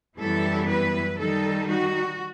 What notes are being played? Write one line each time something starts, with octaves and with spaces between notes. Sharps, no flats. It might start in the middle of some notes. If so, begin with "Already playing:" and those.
F#2 E3 G3 B3 E4 A4
B4
D#3 G3 D#4 A4
F#4